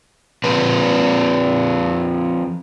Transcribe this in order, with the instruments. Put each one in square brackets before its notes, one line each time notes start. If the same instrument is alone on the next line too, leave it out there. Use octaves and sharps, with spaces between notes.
[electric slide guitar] F3 C4 B4